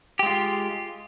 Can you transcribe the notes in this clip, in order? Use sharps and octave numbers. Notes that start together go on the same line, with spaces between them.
G#3 F4 G4